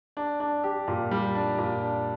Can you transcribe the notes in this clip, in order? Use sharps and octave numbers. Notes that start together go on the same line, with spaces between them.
D4
D4
G4
A#2
G3
D4
A#2
D4